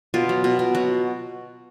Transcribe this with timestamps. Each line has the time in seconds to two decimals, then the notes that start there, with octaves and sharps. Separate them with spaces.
0.14 B2 F4
0.29 F#3
0.44 B2
0.59 B2
0.75 F#3 F#4